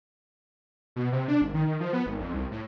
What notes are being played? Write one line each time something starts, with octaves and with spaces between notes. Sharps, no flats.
B2
C3
D4
G#1
D#3
D#3
F3
B3
G#1
F2
C2
A2